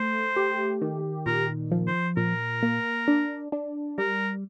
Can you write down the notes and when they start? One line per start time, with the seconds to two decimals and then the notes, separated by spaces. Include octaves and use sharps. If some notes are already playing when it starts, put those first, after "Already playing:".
Already playing: A3 C5
0.36 G4
0.82 D#3
1.26 A#2 A#4
1.71 F3
1.87 C5
2.17 A#2 A#4
2.63 A#3
3.08 D4
3.52 D4
3.98 G3 A#4